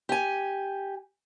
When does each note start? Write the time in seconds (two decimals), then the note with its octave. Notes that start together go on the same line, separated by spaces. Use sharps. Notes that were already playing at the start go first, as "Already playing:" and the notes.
0.09 G4 G#5